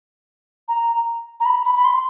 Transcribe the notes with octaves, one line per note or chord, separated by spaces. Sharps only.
A#5
A#5
B5
B5
B5
C6